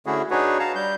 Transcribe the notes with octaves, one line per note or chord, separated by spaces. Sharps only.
D3 A3 C#4 E4 F#4 G#4
D4 D#4 F#4 G#4 B4 C#5
F5 A5 A#5
G3 G6